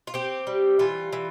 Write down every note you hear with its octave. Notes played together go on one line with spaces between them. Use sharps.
F4
C4 G4
G3
E3 F4
E3